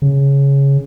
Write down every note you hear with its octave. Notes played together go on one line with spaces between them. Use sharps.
C#3